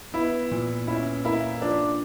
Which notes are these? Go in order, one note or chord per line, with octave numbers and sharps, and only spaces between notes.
B3 E4
A#2
C#4 E4
A#3 E4
F3 D4